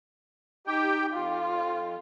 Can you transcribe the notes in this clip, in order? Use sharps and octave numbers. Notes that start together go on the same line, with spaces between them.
D#4 G4 G5
F2 F4